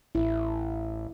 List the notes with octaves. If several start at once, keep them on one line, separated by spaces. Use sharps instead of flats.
A1 E4